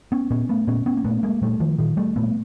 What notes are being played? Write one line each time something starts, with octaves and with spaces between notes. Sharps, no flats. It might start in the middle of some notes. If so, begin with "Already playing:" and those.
B3 C#4
A#2 B3 C#4
A3 B3
A#2 B3 C#4
B3 C#4
A#3
A#2 A3 B3
G#3 A#3
A#2 G3 A3
D#3 F3
A#2 D#3 F3
G3 A3
A#2 A3 B3